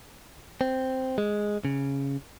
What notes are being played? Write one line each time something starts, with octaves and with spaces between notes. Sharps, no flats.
C4
G#3
C#3